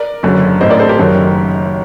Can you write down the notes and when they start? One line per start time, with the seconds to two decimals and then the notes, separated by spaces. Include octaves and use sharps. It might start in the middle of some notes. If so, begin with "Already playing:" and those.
Already playing: A#4 D5
0.23 F#1 F#2 D3
0.61 A1 A2 C5 D#5
0.70 A#4 D5
0.79 A4 C5
0.89 G4 A#4
0.99 F#1 F#2 D#3